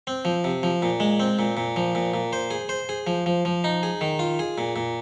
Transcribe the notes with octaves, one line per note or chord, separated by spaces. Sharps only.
C4
F3
C3
F3
A#2
G#3
C4
A#2
A#2
F3
A#2
A#2
C5
G#4
C5
G#4
F3
F3
F3
D#4
G#4
D#3
F4
G#4
A#2
A#2